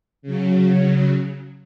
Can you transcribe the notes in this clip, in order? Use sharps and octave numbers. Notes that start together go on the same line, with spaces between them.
C#3 F#3